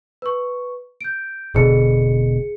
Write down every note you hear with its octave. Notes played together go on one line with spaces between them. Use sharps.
B4 C#6
G6 D7
E1 B2 D3 G#4 C#7